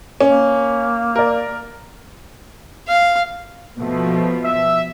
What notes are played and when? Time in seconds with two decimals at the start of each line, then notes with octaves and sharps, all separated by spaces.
0.21 A#3 C#4
1.16 A#4 D5
2.88 F5
3.79 B2 F3 A3
4.43 E5